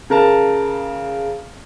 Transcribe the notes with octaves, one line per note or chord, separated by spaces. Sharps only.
C#3 A#4 A5